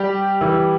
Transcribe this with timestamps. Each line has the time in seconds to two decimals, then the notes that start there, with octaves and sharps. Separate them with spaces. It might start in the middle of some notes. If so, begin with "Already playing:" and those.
Already playing: G3 G4
0.41 E3 E4